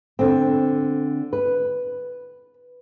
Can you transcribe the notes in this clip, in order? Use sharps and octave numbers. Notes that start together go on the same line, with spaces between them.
D3 C4
B4